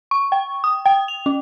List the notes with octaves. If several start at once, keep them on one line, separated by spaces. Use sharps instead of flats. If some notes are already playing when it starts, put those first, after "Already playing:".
C#6
G5
D#6
G5
F7
C#4